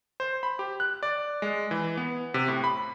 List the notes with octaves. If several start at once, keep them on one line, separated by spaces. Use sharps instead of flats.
C5
B5
G4
F#6
D5
G#3
E3
B3
C3
A2
B5